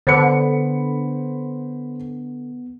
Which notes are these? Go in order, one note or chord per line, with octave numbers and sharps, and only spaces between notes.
D3 B3 C5 B5 C#7